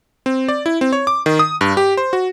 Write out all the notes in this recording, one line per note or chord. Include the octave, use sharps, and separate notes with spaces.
C4
D5
E4
C4
C#5
D6
D#3
D#6
G2
G4
C5
F#4